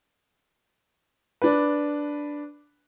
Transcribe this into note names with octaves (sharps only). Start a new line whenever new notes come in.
D4 B4